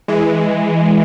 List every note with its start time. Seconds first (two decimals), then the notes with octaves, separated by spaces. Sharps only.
0.08 E3 G#3